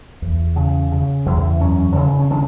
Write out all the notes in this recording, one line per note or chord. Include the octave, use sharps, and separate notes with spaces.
E2
C#3
C#3
E2
F#2 C#4
C#3
C#4
C#3 D4